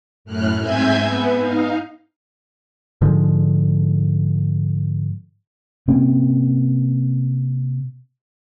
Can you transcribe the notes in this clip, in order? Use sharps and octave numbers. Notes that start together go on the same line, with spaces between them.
F#2 A2 F6 F#6
G#2 C4 E5 G#5 G6 G#6
B3
D#4 F5
G#2 D3 F3 G#3
C3 A#3 C4 C#4